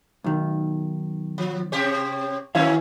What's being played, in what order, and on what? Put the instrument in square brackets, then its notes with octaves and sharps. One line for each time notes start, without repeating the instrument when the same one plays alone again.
[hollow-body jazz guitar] B1 D#3
[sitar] F3
C3 G4 C#5
[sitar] D#3 F#3 C#4 [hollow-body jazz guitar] E4 C#5 F5